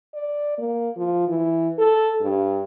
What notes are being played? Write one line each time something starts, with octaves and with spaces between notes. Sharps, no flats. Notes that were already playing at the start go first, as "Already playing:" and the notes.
D5
A#3
F3
E3
A4
G2